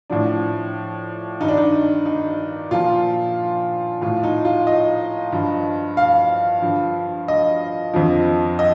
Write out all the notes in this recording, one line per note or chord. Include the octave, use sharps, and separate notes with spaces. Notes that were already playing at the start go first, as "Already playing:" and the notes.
A2 F3 D4
G2 D#3 D#4
D4
D#4
D#4
A#2 F3 F4
A2 F3 F4
D#4
F4
D#5
G2 F3
F5
G2 D3 F3
D#5
F2 D3 F3
D#5